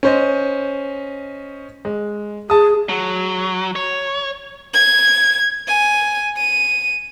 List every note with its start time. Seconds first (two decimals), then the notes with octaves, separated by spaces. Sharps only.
0.03 C#4 C5 D#5
1.85 G#3
2.50 G#4 A5 D#6
2.89 F#3
3.76 C#5
4.74 G#6
5.67 G#5
6.37 D#7